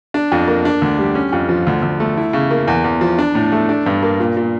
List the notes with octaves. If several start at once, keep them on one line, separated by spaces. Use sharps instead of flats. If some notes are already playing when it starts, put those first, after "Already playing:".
D4
F2
A#3
D4
D2
G3
C#4
F2
F3
D2
D2
A3
E4
C#3
A#3
E2
E2
F3
D4
A2
A3
D4
G2
A#3
A#2
A#2